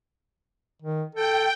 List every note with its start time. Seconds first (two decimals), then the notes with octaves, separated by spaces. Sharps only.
0.82 D#3
1.15 A4 G5